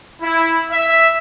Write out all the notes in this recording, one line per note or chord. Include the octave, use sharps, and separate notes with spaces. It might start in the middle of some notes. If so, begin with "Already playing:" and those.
E4
E5